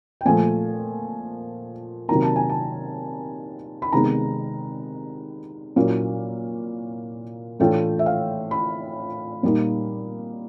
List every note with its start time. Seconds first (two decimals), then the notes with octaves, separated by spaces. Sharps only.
0.21 G5
0.25 A#2 F3 A3 G#5
2.08 C3 D#3 F#3 A#3 A#5
2.22 A5
2.36 G#5
2.49 A5
3.82 B5
3.93 C3 D#3 G#3 B3 D#4 A#5
5.76 A#2 F#3 A#3 C#4 E4
7.60 A2 E3 A3 D4 F4 G5
7.99 E5
8.06 F5
8.51 B5
9.43 A#2 G3 A#3 D#4